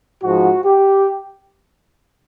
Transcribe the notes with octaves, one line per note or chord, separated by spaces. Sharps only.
G#2 F3 F#4
G4